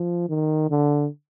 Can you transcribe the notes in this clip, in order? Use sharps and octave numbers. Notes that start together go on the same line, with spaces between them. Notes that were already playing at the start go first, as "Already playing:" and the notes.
Already playing: F3
D#3
D3